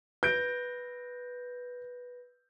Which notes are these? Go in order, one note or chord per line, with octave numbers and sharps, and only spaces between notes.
B4 G6 A#6 D7